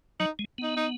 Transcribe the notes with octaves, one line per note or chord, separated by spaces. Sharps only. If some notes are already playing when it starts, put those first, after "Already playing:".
F#3 D#4
G#3
B3 D#4
D#4